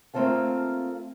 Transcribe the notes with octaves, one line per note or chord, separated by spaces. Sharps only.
A3 A#3 C4 F4 A4 F5